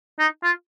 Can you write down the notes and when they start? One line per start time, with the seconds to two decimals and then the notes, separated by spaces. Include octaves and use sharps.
0.19 D#4
0.43 F4